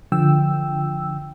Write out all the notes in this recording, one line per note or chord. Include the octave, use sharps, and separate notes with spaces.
D3 F3 G5 E6